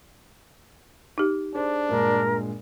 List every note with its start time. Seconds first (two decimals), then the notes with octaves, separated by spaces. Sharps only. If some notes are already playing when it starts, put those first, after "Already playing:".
1.18 D#4 G4
1.55 D4 G#4 C5 D5
1.89 G2 A#2 G#3 A#4